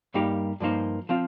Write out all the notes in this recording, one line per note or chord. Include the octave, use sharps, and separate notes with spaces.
G2 G3 A#3 D#4 G4
G2 F3 A#3 D#4 C5
F3 C4 F4